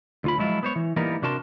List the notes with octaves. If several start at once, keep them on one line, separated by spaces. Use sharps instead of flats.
D2 F4 B5
F3 F#3 G#3 E4 F4
B3 C5 C#5
E3
E3 G3 A#3 B3 D#4 A#4
C3 D4 F#4 A#4 A5 C6